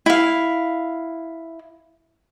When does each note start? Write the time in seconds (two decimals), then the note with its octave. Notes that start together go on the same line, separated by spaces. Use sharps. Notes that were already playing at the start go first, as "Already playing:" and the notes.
0.06 E4 F5